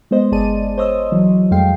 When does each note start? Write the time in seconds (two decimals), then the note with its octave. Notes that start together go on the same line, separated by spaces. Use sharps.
0.11 G#3 B3 C5 D#5
0.32 G1 G#4 C5 D5 A5 D#7
0.78 C5 C#5 D#5 D#6 E6
1.12 E3 F#3
1.51 F2 G#3 A3 F5 G5 C7